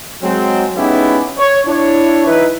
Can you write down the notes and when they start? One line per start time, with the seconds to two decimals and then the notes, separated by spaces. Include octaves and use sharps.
0.23 F#3 G#3 C4
0.76 G#3 B3 C#4 D#4 E4 G4
1.38 C#5
1.67 D4 E4 C#5
2.27 E3 D#4 E4 B4